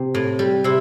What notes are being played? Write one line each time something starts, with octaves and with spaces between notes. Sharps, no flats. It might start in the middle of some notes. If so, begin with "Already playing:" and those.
Already playing: C3 C4
A2
G3
C3 E4